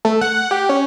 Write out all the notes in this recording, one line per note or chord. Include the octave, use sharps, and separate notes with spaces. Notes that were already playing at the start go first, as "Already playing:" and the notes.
A3
F#5
G4
C#4